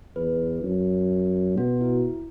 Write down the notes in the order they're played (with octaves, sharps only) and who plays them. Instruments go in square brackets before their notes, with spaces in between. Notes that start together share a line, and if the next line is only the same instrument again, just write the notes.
[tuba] E2 [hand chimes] B4
[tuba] F#2
[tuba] B2 [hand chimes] F#4
[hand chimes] E4